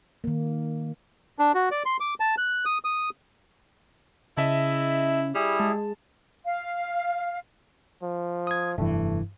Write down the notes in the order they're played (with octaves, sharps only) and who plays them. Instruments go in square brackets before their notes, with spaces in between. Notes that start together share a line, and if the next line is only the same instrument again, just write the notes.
[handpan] D#3 A#3
[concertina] D4
F#4
D5
C6
D6
A5
F#6
D#6
D#6
[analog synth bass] C#3 [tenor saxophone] E4 [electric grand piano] D#5 E5 A5
[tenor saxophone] G3 [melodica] E4 G#4
[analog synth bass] G#3 [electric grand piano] A5
[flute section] F5
[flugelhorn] F3
[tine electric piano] D#6 G#6
[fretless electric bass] F1 E3 [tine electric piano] G2 [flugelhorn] A3